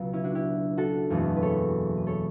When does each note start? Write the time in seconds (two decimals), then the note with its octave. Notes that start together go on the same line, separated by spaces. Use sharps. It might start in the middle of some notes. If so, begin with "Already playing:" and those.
Already playing: C#2 B2 F#3 B3
0.13 C#4 E4
0.24 D4 F#4
0.35 E4 G4
0.78 F#4 A4
1.10 F#1 E2 B2 A3
1.37 B4
1.42 A4 C#5
1.97 B4
2.07 A4 C#5